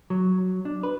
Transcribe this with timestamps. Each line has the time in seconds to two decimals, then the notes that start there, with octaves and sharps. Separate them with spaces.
0.10 F#3
0.65 D4
0.83 B4